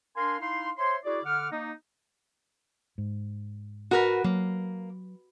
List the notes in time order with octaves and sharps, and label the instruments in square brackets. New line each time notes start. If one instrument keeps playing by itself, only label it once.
[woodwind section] D4 A#4 F5 G#5 C6
D#4 E4 F5 C6
C5 C#5 E5 C6
E4 F#4 G#4 D5
D3 F#5 D6 F6
A#3 D#4
[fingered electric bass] G#2
[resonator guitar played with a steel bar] F#4 A#4 B4
[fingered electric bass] F#3 [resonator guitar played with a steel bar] A#3